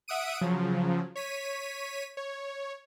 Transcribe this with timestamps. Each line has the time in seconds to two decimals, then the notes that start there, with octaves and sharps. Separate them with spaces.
0.08 E5 F#5 D#6 D7 D#7
0.41 C#3 F3 F#3
1.16 C#5 B6 D#7
2.17 C#5